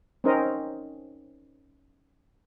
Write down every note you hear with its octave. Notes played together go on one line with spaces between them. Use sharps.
C4 C#4 D#4 A#4 C5 D#5